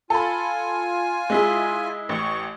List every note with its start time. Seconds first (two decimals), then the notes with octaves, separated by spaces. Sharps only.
0.10 F4 A4 G#5 B5
1.30 G#3 E4 G#4
2.09 A1 C#6